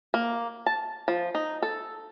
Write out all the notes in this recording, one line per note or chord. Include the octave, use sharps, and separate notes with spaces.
A#3
A5
F3
D#4
A4